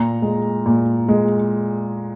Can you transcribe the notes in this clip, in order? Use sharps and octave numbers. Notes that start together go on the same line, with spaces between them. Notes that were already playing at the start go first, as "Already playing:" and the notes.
Already playing: A#2 A#5
G#3
A#2
G#3